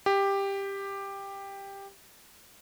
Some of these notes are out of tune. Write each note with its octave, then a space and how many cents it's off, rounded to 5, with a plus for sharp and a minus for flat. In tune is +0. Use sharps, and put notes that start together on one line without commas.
G4 +10